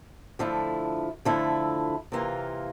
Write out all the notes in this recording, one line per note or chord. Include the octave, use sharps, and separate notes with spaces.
D3 F3 A3 E4
D3 F3 A3 E4
C3 E3 A#3 F4